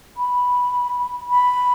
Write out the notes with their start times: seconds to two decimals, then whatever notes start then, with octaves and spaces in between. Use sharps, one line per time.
0.17 B5
1.30 B5